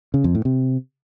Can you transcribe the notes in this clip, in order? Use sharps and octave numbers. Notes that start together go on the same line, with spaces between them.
C#3
F2
A2
C3